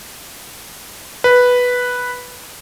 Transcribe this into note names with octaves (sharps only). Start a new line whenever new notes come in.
B4